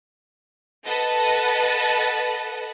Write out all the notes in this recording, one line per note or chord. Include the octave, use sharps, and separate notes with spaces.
A4 B4 D#5 F#5 A5